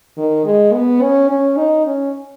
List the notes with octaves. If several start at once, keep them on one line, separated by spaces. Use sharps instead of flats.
D#3
G#3
B3
C#4
C#4
D#4
C#4